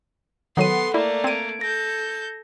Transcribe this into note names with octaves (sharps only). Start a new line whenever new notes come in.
D#3 F#3 B3 A4 F#5 C6 D#7
A3 A#3 E4 D5
C4 G#6 D7 D#7
A4 G6 A#6